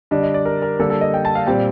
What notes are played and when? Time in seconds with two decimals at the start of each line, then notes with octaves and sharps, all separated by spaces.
0.11 D3 G3 D4 D#5
0.23 D#5
0.34 D5
0.45 A#4
0.62 A#4
0.79 D3 G3 A#3 A4
0.90 A4
1.01 D#5
1.14 G5
1.25 A5
1.35 F5
1.47 A#2 G3 C4 G5